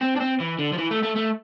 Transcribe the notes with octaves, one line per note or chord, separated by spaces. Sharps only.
C4
D4
C4
E3
D3
F3
E3
A3
A3
A3